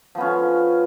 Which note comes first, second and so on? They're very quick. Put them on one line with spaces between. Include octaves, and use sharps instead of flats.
F3 B3 C#4